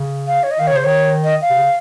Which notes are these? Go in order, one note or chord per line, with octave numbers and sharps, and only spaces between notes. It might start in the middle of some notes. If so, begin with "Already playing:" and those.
Already playing: C#3
F5
C#5
D#5
D#3 F5
C#5
C#3 C5
D#3 C#5
D#5
F5
C3
C#3